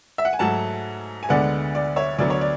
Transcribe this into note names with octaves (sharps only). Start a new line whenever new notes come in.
E5
F#5
G#5
G#2 F#3 A3 F#5 A5
G#5
D2 D3 G#3 B3 D5 F#5
D5
C#5 E5
D2 D3 F#3 B3 D5
C#5
D5